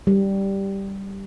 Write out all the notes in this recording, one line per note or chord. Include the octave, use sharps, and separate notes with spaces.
G3